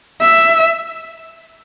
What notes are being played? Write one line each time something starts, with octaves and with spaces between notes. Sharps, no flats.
E5